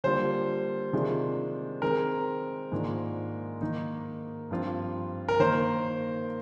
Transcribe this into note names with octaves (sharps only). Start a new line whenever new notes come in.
D3 G3 A#3 F4 C5
C3 D#3 G#3 D4 F4
D#3 G#3 C4 A#4
G#2 D#3 A#3 D4 F4
D#3 A#3 D#4
G2 F3 C4 F4
A#4
D#3 A#3 D#4 C5